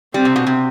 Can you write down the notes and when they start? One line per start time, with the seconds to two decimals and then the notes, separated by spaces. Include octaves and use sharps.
0.14 G3 C4
0.25 C3
0.36 B2
0.47 C3